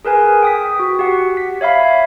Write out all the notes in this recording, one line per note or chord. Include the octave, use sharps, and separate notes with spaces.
G#4 A#4 B4 G#5
G5 D#6 B6
F#4
G4 F#5
B6
C#5 E5 F5 B5